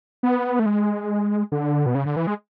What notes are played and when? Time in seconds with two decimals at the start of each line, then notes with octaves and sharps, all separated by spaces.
0.23 B3
0.59 A3
0.66 G#3
1.52 D3
1.86 B2
1.95 C#3
2.06 D3
2.16 E3
2.27 G#3